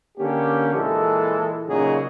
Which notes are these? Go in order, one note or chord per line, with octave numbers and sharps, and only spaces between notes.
D3 A#3 C#4 G4
A#2 E3 G#3 A4
A#2 C#3 F#3 D#4 G#4